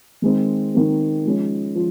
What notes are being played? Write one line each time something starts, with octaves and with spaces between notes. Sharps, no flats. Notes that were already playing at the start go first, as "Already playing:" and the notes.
D#3 G#3 C4
D#3 G#3 C4
F3 G#3 C#4
F3